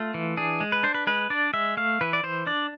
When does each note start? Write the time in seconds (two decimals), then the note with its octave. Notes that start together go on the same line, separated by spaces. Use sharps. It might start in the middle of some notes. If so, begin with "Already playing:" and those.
Already playing: A3 F4
0.14 E3
0.37 D4 G#4
0.60 G#3
0.72 B4
0.83 D4 C5
0.94 B4
1.07 G#3 B4
1.30 D4 D5
1.53 G#3 E5
1.77 A3 F5
2.01 E3 B4
2.13 D5
2.23 E3 C5
2.47 D4 D5